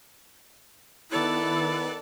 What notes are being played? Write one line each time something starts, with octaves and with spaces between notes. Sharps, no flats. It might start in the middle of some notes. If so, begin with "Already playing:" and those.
D#3 B3 E4 A4 D5 F#6